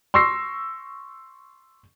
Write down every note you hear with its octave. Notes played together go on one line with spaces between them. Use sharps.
C6 C#6 E6 A#6 C7